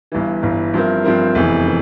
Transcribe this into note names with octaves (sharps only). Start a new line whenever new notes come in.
G1 G2 E3
G1 G2 E3
G2 F3 C4 E4 A#4
G2 F3 C4 E4 A#4
F1 E2 E3
E3